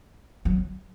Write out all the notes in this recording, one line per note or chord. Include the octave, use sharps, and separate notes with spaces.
F#3